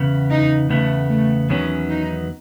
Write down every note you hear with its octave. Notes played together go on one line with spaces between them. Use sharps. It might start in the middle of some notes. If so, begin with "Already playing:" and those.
Already playing: E2 C#3 B3
D#4
E2 C#3 A3 B3
A3
E2 D#3 F#3 B3 C#4
D#4